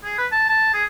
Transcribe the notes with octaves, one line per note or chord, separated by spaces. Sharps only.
G#4
B4
A5
A5
G#4